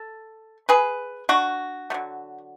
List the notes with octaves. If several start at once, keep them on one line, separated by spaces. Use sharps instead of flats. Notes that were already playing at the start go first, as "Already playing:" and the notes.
Already playing: A4
G#4 B4
D4 F#4
D3 F#3 A3